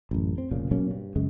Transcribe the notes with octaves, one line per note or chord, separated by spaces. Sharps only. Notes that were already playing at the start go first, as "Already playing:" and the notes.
A1 F#2
C4
F1 A#2 C#3
B2 F#3 A#3 C#4
G2
F#2 C#3 G#3